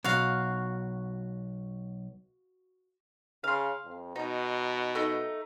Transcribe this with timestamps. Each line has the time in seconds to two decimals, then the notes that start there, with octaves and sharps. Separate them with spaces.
0.04 B1 F#4 F5
3.44 C#3 F5 C6
3.85 F2
4.16 B2 D#4
4.95 A3 D#4